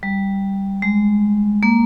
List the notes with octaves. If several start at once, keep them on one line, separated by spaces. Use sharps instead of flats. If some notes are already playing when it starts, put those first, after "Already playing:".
G3
G#3
A#3